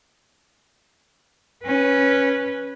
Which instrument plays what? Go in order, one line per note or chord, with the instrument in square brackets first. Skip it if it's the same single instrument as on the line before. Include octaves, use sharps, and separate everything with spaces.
[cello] C#4 B4